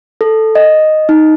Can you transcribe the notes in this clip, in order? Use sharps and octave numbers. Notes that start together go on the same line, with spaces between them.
A4
D#5
D#4